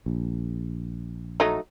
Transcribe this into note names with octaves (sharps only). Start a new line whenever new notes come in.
A#1
F#3 A3 D#4